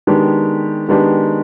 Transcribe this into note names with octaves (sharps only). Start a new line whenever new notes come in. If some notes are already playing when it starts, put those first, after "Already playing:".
D#3 G#3 B3 D4 G4
D#3 G#3 B3 D4 G4